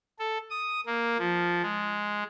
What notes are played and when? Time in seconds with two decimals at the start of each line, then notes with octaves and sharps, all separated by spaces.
0.19 A4
0.50 D#6
0.86 A#3
1.19 F3
1.62 G#3